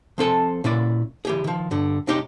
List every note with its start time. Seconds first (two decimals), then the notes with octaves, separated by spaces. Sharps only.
0.18 F3 C4 A4 G#5
0.64 A#2 C#4 E4 D5
1.25 E3 G4 G#4
1.44 D#3 F3
1.71 G2 D3
2.07 B1 C3 G#3 D#4 G4 C#5